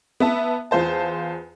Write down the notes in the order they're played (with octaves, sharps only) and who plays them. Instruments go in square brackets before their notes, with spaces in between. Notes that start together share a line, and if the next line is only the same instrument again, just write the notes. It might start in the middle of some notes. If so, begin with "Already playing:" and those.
[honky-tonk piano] B3 E5 A5
E2 F4 C5 A5